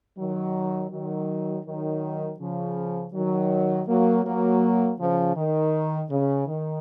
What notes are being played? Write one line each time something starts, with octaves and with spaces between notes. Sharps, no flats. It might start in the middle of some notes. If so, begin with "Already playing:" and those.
D#3 F#3
D#3 F#3
D#3 F#3
C#3 F3
D#3 F#3
F#3 A#3
F#3 A#3
C#3 F3
D#3
C#3
D#3